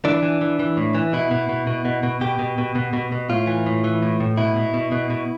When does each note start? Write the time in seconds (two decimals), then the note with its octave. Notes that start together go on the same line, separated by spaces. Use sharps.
0.05 E3 D4
0.22 E3
0.41 E3
0.59 E3
0.77 A2
0.95 E3
1.13 B2 E4
1.31 B2
1.49 B2
1.67 B2
1.85 B2
2.03 B2
2.21 B2 G4
2.39 B2
2.58 B2
2.75 B2
2.93 B2
3.12 B2
3.30 A2 F4
3.47 E3
3.66 A2
3.84 E3
4.03 A2
4.20 A2
4.37 B2 E4
4.56 B2
4.74 B2
4.92 B2
5.10 B2